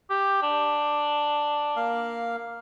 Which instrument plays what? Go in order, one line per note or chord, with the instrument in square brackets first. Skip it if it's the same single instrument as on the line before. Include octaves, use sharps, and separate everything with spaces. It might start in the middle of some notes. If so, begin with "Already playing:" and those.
[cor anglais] G4
D4
[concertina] A#3 F5